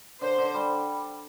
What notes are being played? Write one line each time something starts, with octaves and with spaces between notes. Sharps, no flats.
D3 C5
D3
G3